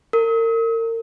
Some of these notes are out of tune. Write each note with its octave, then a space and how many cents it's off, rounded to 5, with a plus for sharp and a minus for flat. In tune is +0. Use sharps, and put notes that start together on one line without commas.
A#4 -35